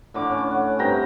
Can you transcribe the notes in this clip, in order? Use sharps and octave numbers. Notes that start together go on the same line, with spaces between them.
A2 D3 D6
C#4
F#5
G2 C3 G5 A#5